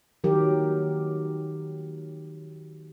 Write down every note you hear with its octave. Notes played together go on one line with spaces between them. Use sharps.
D#3 F#3 G4 A#4